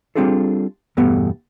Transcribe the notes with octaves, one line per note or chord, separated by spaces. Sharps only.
G3 C4 D4 F4 G#4 A4
E2 G2 B2 A3 B3